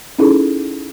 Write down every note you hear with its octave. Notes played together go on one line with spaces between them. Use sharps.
C#4 D#4 E4 G#4 A4